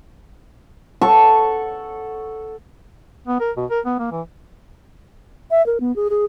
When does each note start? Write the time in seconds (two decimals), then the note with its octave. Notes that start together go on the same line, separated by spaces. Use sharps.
1.01 A4 F#5 C#6
3.27 B3
3.40 A#4
3.57 B2
3.71 A#4
3.86 B3
3.99 A#3
4.12 E3
5.51 E5
5.66 A#4
5.80 B3
5.96 G#4
6.10 G#4